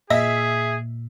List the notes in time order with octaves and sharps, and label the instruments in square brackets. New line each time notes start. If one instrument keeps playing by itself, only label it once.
[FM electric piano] A#2 [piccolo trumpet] G#4 [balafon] D#5 [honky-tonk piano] E5